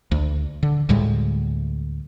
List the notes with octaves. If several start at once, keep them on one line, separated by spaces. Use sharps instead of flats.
D2
D3
D2 A2 G3 G#3